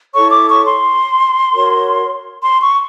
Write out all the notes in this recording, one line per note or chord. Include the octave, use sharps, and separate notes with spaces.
E4 A4 C#5 C#6
D6
C#6
C6
F#4 A#4 C#5
C6
C#6